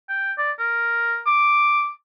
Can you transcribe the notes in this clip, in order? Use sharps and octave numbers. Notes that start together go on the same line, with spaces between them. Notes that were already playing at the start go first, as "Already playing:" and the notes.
G5
D5
A#4
D6